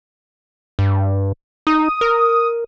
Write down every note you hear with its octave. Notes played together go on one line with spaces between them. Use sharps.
G2
D#4 D#6
A#4